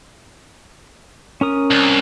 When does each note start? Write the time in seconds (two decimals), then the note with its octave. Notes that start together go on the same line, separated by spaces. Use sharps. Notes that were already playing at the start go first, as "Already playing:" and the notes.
1.41 C#4 A#4 D#6
1.71 C2